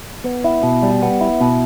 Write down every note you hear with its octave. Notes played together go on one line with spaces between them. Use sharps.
B3
E4
B2
G3
B3
E4
B2